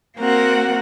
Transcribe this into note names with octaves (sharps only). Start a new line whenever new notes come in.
A#3 C4 F#4 A#4 F#5